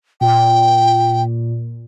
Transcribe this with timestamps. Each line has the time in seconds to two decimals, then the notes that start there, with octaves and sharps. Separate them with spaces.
0.21 A#2 G5